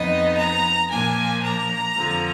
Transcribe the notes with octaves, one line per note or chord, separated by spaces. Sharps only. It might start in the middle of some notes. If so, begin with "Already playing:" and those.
Already playing: F2 F3 B3 D#4 D#5
A#5
A#2 F3 A#3 D4 G#5
A#5
F2 D3 F3